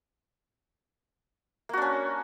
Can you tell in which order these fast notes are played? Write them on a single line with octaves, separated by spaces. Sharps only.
A#3 F#4 D4 C#4